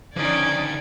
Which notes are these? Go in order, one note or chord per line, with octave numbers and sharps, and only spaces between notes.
D3 D#3 F3 C#4 D#4 D5 G#6